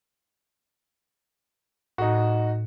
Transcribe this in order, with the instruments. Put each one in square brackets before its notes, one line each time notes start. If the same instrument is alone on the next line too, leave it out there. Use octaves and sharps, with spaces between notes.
[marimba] A2 [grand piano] D#4 F#4